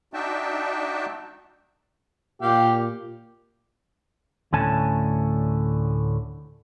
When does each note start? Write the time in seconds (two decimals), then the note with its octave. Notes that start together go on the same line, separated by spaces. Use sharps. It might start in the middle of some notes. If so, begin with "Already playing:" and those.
0.14 D4 D#4 F#4 E5 G5 A5
2.42 A#2 G4 F5 G5
4.53 D2 A2 D3 C#4 G#5 A5